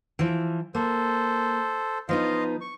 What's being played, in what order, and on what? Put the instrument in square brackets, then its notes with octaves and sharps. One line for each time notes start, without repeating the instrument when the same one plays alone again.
[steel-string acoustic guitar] E3 F3
[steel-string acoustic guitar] A#3 [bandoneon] A4 C5
[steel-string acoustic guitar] F3 B3 D#4 [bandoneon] F4 D#5 F5
[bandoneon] C#6